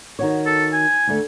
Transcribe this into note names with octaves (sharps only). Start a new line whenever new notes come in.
D#3 F#4 C#5
A4
G#5
D2 A3